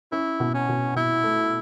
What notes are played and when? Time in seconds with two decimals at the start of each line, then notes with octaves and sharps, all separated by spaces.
0.12 C#4 E4
0.40 B2
0.54 C#4
0.69 B2
0.95 B2 E4
1.23 A3